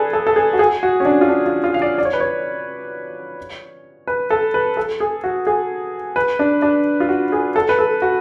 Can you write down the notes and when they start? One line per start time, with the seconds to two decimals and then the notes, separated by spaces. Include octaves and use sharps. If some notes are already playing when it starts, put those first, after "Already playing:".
Already playing: G#4 A4 B4 D5
0.13 A4
0.27 A4
0.36 G#4
0.53 F#4
0.59 G#4
0.83 F#4
1.00 C#4
1.05 D4
1.21 F4
1.29 D4
1.46 F4
1.64 F4
1.74 F5
1.82 D5
1.98 D5
2.05 C#5
2.13 B4
2.20 C#5
4.07 B4
4.30 A4
4.54 B4
4.77 A4
5.00 G#4
5.24 F#4
5.47 G#4
6.16 B4
6.39 D4
6.62 D4
7.00 F4
7.09 F#4
7.32 G#4
7.56 A4
7.69 B4
7.79 A4
8.02 F#4